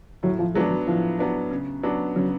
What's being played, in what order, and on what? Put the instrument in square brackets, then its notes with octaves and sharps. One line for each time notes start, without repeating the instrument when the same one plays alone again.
[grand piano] A2 [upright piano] F#3
[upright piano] F3
[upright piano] F3 G#3 [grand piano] F#3 B3 D4
[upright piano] F#3
[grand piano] A2 [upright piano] F3
[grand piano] F#3 B3 D4
C#3
F#3 B3 D4
[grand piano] C#3 [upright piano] F#3